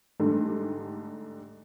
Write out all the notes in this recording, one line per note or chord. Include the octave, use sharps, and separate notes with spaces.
G#2 D3 G3 A3